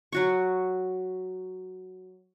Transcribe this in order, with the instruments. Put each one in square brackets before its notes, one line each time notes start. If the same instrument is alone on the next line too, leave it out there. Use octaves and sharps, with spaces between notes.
[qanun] F#3 F#4 C#6